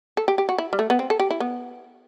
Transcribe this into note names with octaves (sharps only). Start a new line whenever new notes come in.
A4
G4
G4
F#4
E4
G3
A3
B3
C4
A4
G4
E4
B3